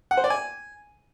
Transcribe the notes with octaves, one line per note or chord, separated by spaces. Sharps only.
F#5
C5
D5
G#5